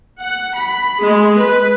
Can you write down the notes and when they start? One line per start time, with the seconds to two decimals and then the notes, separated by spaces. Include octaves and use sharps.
0.22 F#5
0.55 B5
1.02 G#3
1.40 B4